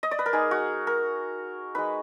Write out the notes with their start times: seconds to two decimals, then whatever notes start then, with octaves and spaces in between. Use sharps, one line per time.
0.03 D#5
0.11 D5
0.19 B4
0.26 A#4
0.33 G#3 D#4 G#4
0.51 F#4
0.87 A#4
1.75 G#3 D#4 B4